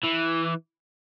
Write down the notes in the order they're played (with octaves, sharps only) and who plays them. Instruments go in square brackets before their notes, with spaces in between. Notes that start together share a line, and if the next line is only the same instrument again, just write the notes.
[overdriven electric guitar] E3